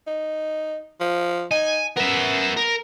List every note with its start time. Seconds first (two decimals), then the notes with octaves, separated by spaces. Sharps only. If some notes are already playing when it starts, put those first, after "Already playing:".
0.07 D#4
1.00 F3
1.51 D#4 G#5
1.97 B3 A#4 E5
2.56 A#4